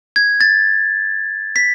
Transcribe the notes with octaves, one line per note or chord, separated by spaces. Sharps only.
G#6
A6
B6